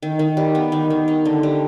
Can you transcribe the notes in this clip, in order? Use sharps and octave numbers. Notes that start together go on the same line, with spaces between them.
D#3
D#3
G3
B3
D#3
D#3
D#4
D3
G3